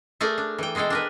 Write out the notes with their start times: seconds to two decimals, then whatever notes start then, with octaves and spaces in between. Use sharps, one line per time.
0.21 A3 G#4 A#4 D5
0.38 D4
0.58 E3 G5
0.75 B2 G#3 G#4 A4 G5
0.90 D4 A#4 B4